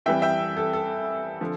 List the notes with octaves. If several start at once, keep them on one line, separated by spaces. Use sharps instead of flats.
F2 E3 G3 E5 G5
E5 G5
A4
A4
D3 F3